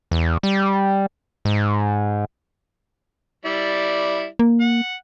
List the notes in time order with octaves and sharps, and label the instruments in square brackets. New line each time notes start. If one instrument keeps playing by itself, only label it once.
[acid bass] E2
G3
G#2
[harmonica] G3 E4 D5
[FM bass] A#3
[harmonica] F#5